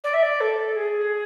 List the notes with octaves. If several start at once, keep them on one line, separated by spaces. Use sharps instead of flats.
D5
E5
D5
A4
G#4